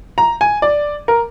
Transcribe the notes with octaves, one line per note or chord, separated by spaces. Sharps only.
A#5
G#5
D5
A#4